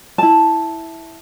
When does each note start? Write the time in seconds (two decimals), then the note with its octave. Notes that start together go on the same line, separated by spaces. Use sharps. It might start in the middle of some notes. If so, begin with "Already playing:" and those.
0.18 E4 A5